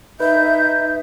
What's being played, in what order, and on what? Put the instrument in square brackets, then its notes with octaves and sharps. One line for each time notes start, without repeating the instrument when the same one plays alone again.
[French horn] D#4 [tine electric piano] B4 [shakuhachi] E5 [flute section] G6